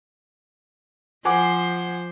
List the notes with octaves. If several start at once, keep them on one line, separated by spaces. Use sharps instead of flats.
F3 C5 F#5 G#5 D6